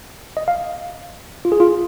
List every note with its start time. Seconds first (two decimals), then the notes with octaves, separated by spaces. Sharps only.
0.37 D#5
0.48 F5
1.45 F4
1.52 G#4
1.60 F4